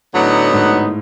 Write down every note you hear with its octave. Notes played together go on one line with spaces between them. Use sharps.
A2 D3 F#3 B3 D#4
G#2
A2